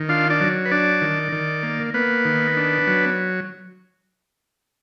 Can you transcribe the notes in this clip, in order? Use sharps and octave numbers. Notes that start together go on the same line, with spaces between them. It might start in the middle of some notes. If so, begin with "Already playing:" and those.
Already playing: D#3
D4 F4 F5
D4 D5
F#3
B4
D4 D5
D#3
D#3
A#3
A#3 B3 B4
D#3
D4
F#3